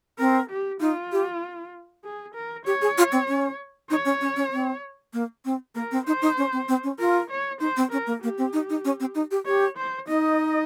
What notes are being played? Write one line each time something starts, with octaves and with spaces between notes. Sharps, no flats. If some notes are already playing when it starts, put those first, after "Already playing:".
C4 A#4
G4
D#4 F4
G4
G#4
A#4
G4 C#5
G#4
F4
C4
C#4
D#4 C#5
C#4
C#4
C#4
C4
A#3
C4
A#3 A#4
C4
D#4 C5
D#4
C#4
C4
C4
C#4
F4 A#4
C#5
D#4 C5
C4
C#4 A#4
A#3
A#3 G4
C4
D#4
D#4
C#4
C4
D#4
G4
G4 C#5
C5
D#4 D#5